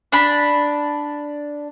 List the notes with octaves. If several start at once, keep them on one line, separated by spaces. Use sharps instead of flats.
D4 B5